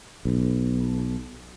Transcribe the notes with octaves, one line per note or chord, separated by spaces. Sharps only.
B1